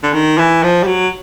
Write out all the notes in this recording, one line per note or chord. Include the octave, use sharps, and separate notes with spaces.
D3
D#3
E3
F3
G3
F#3